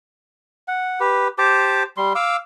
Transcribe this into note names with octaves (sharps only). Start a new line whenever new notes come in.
F#5
G4 B4
G4 C5 A5 D6
G3 C6
F5 D6 E6